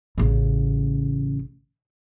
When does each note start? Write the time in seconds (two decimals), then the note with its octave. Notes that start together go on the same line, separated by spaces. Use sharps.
0.18 A1 C#3